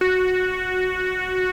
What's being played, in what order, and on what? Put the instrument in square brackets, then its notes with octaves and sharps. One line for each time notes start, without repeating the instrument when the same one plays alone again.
[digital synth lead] F#4